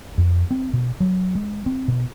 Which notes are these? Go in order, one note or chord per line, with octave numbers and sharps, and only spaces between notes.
F2
C4
B2
F#3
G#3
C4
B2